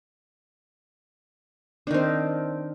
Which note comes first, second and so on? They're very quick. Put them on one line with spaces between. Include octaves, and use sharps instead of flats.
D4 D#3 C4